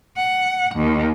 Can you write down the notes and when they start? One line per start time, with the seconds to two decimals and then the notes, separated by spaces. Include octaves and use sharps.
0.17 F#5
0.75 D#2